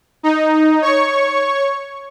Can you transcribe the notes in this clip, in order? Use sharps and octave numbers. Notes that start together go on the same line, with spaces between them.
D#4
C#5 C#6